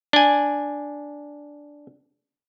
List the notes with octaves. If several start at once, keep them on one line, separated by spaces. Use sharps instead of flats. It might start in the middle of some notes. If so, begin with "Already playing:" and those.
D4 G#5